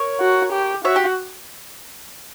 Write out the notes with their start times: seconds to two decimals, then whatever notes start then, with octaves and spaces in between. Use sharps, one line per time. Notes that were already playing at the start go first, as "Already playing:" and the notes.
Already playing: A#4 C#5
0.20 F#4
0.52 G4
0.85 F#4 C#5 E5
0.96 G4